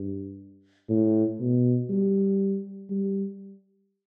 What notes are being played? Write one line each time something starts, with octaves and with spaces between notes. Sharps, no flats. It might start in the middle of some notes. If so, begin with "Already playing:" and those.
Already playing: G2
A2
B2
G3
G3